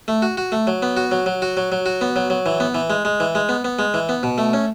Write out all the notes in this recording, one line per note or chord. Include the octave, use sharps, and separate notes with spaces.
A3
F#4
F#4
A3
F#3
B3
F#4
F#3
F#3
F#4
F#3
F#3
F#4
B3
F#3
F#3
E3
B3
E3
G#3
G#3
E3
G#3
B3
B3
G#3
E3
B3
B2
A3
C#4